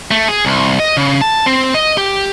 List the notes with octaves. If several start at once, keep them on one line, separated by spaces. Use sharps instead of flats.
A3
G#4
C2
D#5
C#3
A5
C4
D#5
G4